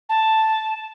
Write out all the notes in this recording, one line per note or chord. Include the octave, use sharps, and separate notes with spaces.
A5